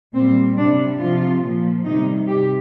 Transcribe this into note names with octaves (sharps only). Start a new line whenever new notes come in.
A#2 G3 C4
C3 G3 D4
C3 F3 F4
A#2 F3
C3 D#3 G3 D#4
C3 G4